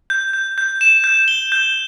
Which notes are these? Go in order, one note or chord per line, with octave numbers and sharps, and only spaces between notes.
G6
G6
G6
E7
G6
G7
G6